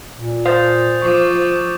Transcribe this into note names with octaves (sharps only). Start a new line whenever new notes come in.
A#2
C5 F5 D#6 G6 A6
F3 C#6 D6